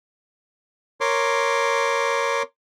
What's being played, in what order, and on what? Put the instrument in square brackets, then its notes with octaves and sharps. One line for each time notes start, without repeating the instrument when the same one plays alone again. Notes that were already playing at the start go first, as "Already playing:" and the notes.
[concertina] A#4 C#5 C6 D6